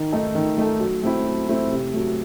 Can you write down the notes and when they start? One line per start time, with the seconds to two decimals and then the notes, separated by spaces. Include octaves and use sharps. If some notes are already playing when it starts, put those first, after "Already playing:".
Already playing: D#3
0.12 A3 D#4 A4
0.35 D#3
0.58 A3 D#4 A4
0.80 F#3
1.03 A3 C4 E4
1.26 F#3
1.49 A3 C4 E4
1.71 C3
1.94 F#3 A3